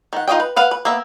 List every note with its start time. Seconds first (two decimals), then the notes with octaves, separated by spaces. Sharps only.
0.13 D#3 F#5
0.28 D#4 F4 F#4 D#5 G5
0.40 B4
0.56 B4 F5 F#5
0.71 B4
0.85 A#3 B3 E5